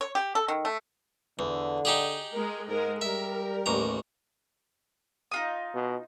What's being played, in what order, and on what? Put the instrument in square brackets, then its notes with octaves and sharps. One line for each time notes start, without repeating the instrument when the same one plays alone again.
[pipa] C#5
G4
A4
D#3
A3
[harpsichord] E2 [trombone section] D3
[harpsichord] D#4 G4 G#4
[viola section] G#3 A#4
[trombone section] G#2 [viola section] G#3 A#4
[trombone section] G3 [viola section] A#4 [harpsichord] E5
[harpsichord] A1 D#2 A#5
[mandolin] D#4 F4 D#6
[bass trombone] B2